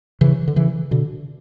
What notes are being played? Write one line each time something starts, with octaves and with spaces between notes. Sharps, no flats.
C#3 E3
D3
C#3 E3
B2 D3